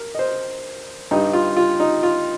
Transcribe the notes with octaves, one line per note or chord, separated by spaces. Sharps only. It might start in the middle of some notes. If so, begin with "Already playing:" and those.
Already playing: A#4
D#5
C5
G2 G3 D#4
F4
F4
D#4
F4